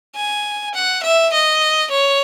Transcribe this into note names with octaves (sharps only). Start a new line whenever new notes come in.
G#5
F#5
E5
D#5
C#5